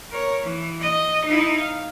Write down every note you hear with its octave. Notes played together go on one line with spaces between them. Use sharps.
A#4 C#5
E3
D#5
D#4 E4
F5